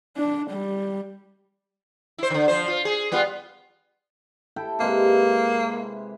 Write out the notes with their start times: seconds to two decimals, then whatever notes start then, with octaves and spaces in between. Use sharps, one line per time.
0.17 D4
0.51 G3
2.18 E4 C5
2.30 D3 D#3
2.48 F3 C5
2.68 F4
2.85 G#4
3.12 G3 B3 F4
4.56 E4 A4 G5
4.80 C3 G#3 A#3 B4